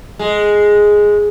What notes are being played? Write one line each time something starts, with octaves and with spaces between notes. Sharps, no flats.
G#3